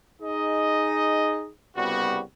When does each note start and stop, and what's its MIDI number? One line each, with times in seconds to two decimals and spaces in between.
0.22 1.49 63
0.22 1.49 68
0.22 1.49 75
1.76 2.20 36
1.76 2.20 49
1.76 2.20 55
1.76 2.20 59
1.76 2.20 66